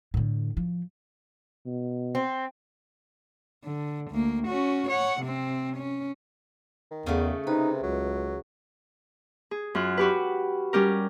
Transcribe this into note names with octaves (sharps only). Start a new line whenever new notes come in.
A2 D3
F3
B2
C4
D3
D2 A#3
C#4 F#4
C#5 F#5
C3 C4
C#4
D#3
E2 C#3 A3
C3 D#4 B4
C#2 F#3
G#4
F#2 F4 F#6
F#4 G4 B4
G3 C#4 G4 A#4